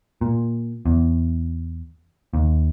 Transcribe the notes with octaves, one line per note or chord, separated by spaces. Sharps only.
A#2
E2
D#2